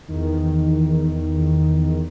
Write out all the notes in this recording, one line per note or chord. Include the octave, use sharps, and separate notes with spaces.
E2 D#3